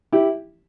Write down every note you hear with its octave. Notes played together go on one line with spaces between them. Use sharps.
E4 G4